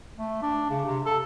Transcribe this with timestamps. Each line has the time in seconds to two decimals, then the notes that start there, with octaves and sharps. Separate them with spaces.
0.17 A3
0.42 D4
0.70 C#3
0.85 C3
1.06 A4